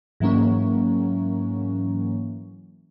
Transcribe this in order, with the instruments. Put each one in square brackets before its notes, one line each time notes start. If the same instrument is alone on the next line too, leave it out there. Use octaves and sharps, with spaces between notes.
[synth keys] G#2 E3 F#3 A#3 C#4